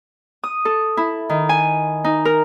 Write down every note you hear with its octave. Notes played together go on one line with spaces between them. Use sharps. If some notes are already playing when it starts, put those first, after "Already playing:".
D#6
A4
E4
D#3
G#5
D#4
A#4